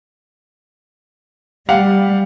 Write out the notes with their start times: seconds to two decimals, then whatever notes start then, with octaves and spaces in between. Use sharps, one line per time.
1.69 G3 G4 F5 F#5